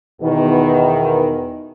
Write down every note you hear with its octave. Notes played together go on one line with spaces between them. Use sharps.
E2 B2 D#3